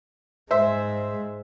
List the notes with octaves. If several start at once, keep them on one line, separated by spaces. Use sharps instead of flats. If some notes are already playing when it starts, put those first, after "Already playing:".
G#2 G#3 C5 E5